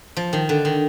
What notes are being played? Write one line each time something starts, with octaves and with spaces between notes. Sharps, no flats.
F3
D#3
D3
D#3